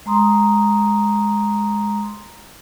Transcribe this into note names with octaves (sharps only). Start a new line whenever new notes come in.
G#3 A#5 C6 D#6